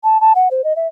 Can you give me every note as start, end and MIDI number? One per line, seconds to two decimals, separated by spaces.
0.04 0.20 81
0.21 0.33 81
0.35 0.48 78
0.51 0.64 72
0.64 0.76 75
0.76 0.87 76